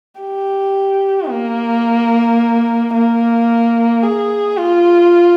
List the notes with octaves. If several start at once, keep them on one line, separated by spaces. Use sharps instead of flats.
G4
A#3
A#3
G#4
F4